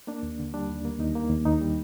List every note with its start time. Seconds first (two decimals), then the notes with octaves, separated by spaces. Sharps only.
0.07 A#3 D4
0.23 D#2
0.39 D3
0.54 G3 D4
0.70 D#2
0.85 A#3
0.99 D#2 D#4
1.15 A#3
1.30 D#2
1.46 D#2 D#4
1.61 G3